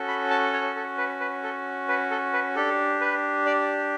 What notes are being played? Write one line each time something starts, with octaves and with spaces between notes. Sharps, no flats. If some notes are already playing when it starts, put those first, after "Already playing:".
Already playing: C#4 F#4 A4
B5
A5
C#5
A4
B4
B4
A4
B4
A4
B4
D4 G4 A4
B4
D5